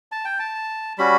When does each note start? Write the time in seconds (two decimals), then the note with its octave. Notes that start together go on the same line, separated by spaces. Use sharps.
0.12 A5
0.25 G5
0.39 A5
0.98 G3 C#4 F#4 B5